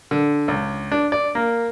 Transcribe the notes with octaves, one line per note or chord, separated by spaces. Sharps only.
D3
C#2
D4
D5
A#3